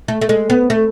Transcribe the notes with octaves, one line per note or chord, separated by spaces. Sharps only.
A3
A3
G#3
B3
A3